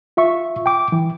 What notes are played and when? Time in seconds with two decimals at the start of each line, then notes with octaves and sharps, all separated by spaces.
0.17 F4 E5 C#6
0.66 G5 D6
0.92 E3